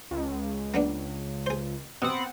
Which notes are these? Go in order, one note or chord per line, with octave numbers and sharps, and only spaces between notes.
C#2
A#3 B3 D4
G#4 C5
B2 B3 C4 F#5